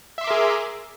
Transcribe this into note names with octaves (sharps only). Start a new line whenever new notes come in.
G#4 A#4 E5 C6 D6